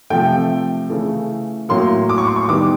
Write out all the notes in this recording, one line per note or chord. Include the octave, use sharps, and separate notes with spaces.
C3 F3 A3 G5
C#3 E3 A3
A2 F#3 A#3 C6
D6
C#6
C6
C#6
D#3 G3 B3 D6